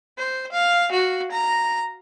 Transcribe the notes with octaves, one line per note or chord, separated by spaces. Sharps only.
C5
F5
F#4
A#5